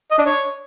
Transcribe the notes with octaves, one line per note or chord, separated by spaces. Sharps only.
D#5
D4
C#5